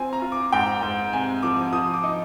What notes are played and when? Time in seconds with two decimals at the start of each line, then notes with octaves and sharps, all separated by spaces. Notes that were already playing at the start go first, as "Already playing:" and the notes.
Already playing: C4 F4 G#5
0.13 A#5
0.22 F4
0.32 D6
0.53 G#2 G5
0.83 G#2
1.13 C3 G#5
1.42 F3 D6
1.73 F3 D#6
1.94 D6
2.03 D#4